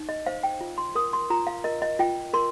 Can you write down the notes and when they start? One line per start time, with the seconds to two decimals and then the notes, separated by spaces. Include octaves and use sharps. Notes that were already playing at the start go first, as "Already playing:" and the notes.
Already playing: D#4
0.09 D#5
0.26 C5 F5
0.43 G5
0.61 F4
0.78 C6
0.95 A#4 D#6
1.13 C6
1.30 F4 A#5
1.47 F5
1.64 A#4 D#5
1.82 D#5
1.99 F4 G5
2.33 A#4 C6